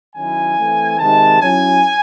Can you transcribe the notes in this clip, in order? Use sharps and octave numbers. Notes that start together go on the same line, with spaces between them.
D#3 F#3 C#4 E4 G#5
E3 A3 C4
C3 D#3 G#3 D#4 A5
F#3 C#4 E4 G#5